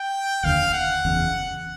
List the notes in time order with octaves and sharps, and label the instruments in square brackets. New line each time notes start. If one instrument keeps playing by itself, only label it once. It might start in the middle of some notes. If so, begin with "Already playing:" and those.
Already playing: [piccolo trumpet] G5
[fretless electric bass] F1 D#2 D3 [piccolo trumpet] F5
[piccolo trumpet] F#5
[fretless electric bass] F#1 E2 C#3